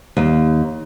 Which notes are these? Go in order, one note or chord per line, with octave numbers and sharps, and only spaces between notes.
D#2